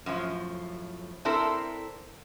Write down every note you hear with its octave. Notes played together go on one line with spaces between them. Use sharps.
F#2 A2 F3
C4 D4 E4 A4 A#4 C5